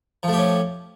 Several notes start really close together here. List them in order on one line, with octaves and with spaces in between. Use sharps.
F3 A3 G4 C#4